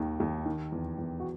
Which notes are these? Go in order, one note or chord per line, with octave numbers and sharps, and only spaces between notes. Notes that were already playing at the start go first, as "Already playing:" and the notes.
Already playing: D#2 D#3
D#2
D#3
E2
E2
F#4